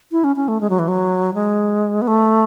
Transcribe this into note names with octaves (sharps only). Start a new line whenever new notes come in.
E4
C#4
C#4
A3
G#3
F#3
E3
F#3
G#3
B3
A3